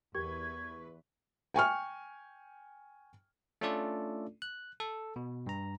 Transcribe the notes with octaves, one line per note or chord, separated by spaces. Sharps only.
E2 G4 A#4 B4 C#6 G#6
G5 G#5 C#6 F6
A3 C#4 D4 F4 A4 D5
F#6
A4
B2
G2 A#5